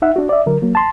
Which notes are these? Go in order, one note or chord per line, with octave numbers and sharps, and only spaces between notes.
D#4 E5 F#5
D4 F#4
D5 E5
D3 F#3 A#4
F#3 A#3
A5 C6